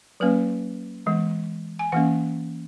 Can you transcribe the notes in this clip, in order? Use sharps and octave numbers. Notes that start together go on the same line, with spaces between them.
F#3 A#3 C#4 B4
E3 G#3 B3
G#5
E3 A#3 C#4 F#5